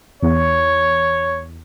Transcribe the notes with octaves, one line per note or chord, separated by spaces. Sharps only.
E2 C#5